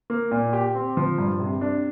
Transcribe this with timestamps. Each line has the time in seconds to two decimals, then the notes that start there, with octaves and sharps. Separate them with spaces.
0.10 A#3
0.31 A#2
0.53 G4
0.75 C4
0.97 F3
1.18 G2
1.40 C3
1.61 D4